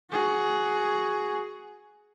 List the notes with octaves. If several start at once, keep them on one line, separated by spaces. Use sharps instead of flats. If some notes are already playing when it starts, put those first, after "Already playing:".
F#4 G#4